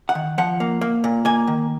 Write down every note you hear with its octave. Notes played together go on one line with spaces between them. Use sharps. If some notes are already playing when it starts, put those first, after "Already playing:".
F#5
D#3
F3 F#5
A#3
A#3
A#2
A#3 G#5
D#3